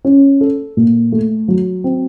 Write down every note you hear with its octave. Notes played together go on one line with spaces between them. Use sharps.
C#4
A4
A#2
A3
F#3
C4